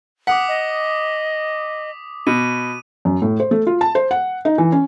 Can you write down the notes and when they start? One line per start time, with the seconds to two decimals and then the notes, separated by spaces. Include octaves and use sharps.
0.27 F#5 D6 D#6 B6
0.49 D#5
2.27 B2 D#7
3.05 F#2
3.22 A2
3.40 C5
3.51 A3
3.67 F4
3.81 A5
3.95 C5
4.11 F#5
4.45 D#4
4.58 E3
4.72 C#4